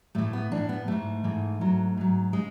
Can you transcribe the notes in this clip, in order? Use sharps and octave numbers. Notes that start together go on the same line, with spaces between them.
A2 E3 A3
B3
A2 E3 D4
B3
G#2 E3 A3
G#2 E3
G#2 F#3
G#2 F#3
C#3 G#3